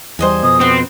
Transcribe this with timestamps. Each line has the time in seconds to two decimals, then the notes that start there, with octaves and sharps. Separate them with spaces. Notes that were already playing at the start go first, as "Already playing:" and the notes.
0.19 E2 G3 C5 D#5 G#5
0.43 F2 B2 D#6
0.61 B3 C4 F#4